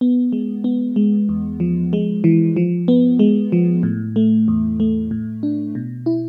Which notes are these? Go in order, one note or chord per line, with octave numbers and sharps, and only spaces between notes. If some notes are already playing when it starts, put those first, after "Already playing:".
B3
G#3
B3
G#3
E2
F3
G#3
E3
F3
B3
G#3
F3
A2
A3
E2
A3
A2
D4
B2
E4